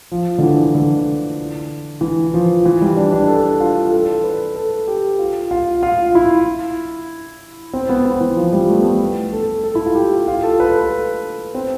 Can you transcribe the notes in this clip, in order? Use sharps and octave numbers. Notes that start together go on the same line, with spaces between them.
F3
D3
E3
D3
E3
F3
E3
G3
D4
D4
A4
F4
A4
B4
A4
G4
F4
F4
F4
E4
C4
B3
B3
E3
F3
G3
A3
B3
A3
A4
A4
E4
F4
G4
G4
F4
A4
B4
A4
C4